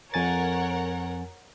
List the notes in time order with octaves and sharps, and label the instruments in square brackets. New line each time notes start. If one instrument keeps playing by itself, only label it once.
[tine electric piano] F2 G#5 A6 [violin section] A#4 C#5 F#5